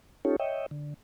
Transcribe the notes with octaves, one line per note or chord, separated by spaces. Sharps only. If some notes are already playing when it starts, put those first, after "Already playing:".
C#4 D#4 F4 G4 A4 C#5
C#5 D#5 E5 G5
D3